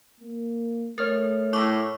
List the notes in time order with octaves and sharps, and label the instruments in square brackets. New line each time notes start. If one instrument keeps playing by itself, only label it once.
[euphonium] A#3
[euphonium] A3 [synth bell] A#4 [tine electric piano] C#5 F6 A6
[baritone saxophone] A2 [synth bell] E4 C#6 D6